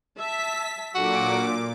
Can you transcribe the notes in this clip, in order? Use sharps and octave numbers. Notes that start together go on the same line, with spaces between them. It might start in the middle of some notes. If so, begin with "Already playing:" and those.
E5 A5 B6
A#2 F#3 D4 F#4 A4 D6